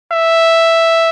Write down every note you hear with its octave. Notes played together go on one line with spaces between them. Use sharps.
E5